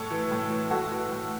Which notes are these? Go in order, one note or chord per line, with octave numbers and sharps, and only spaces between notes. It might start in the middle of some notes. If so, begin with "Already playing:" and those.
Already playing: A2 A4 C#5
E3
A2
E3
A2 F#4 A4
E3
A2